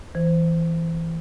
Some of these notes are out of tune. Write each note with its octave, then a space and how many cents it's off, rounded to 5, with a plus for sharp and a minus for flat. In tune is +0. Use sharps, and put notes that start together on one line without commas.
E3 +0 C5 -15